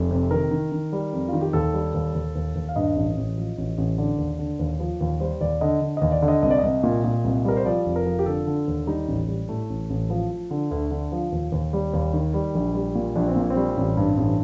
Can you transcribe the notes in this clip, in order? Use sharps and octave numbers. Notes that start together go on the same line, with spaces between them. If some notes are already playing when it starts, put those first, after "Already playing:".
Already playing: F1
C3
D#3 A#4
D#3
D#3
G3
F2
D#3 F4
G4
D#2 A4
G3
D#2
D#2
D#2
D#2
F5
G2 D#5
A1
A1
F3
A1
A1
D3 D5
D#2
D3
D#2
F3
D#2
G3 C5
D#2 D5
D3 D#5
D3
D#2 D#5
D5
D3
D#5
C2 D#5
D5
C2 D#5
A#2
A#2
C2
G3 A#4
C5
F3 D5
F1
A#4
F3
G4
D3 A4
D3
D#2
G3 D#4
A1
G3
A2 A3
A1
A1
F3
F3
D3
D2
D3
F3
D#2
D#2
G3
D#2
D#3
G3
A#1
G3
A#2
A#1 D4
C4
A#2 A#3
C4
G3
A1
G2
A1